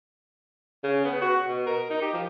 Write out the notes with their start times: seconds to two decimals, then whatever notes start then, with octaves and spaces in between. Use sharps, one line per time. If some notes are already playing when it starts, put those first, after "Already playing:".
0.83 C#3
1.05 B3
1.22 F#4
1.49 B2
1.67 A#4
1.90 D#4
2.02 G4
2.14 F3